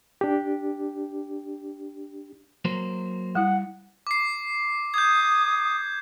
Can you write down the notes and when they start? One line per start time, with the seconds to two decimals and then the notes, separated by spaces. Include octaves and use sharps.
0.21 D4 G4
2.65 F#3 A#3 C5
3.35 G3 E4 F#5
4.07 D6 C7
4.94 D#6 G6 G#6